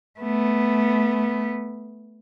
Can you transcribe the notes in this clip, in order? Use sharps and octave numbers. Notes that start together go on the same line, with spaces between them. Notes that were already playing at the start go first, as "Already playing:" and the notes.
A3 B3